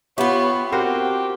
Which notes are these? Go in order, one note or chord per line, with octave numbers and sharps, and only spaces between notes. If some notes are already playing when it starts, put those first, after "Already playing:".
B3 F4 G4 C#5 E5
C4 F#4 G4 A#4 C5